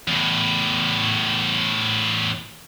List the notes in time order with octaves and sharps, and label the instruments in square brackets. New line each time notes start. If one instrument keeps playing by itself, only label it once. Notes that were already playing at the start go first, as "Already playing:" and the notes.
[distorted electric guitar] E2 A2